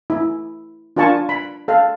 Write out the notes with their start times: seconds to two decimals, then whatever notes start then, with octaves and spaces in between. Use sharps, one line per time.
0.10 E4
0.96 D4 F4 A#4 G#5 A5 C#6
1.29 B5
1.68 A4 F5